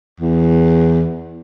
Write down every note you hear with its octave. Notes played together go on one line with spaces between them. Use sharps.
E2